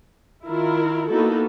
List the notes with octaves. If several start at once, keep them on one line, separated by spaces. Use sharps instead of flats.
D#3 E4 F4 A#4
A#3 B3 D#4 E4 F#4 A4